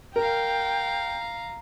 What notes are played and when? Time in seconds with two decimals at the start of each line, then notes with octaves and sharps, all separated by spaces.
0.16 A#4 F5 G5 A#5